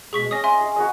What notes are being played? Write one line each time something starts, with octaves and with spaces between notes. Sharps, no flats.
B2 G#3 G#4 C#6 B6
C#4 D#5 D#6 A#6
E5 G#5 C6
G#4
F#4 G#4 B4 D#5